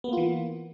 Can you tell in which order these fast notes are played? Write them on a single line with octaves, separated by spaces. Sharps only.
B3 A#3 F4 E3